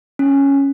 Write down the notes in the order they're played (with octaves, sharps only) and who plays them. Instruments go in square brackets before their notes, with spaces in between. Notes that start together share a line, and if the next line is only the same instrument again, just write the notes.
[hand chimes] C#4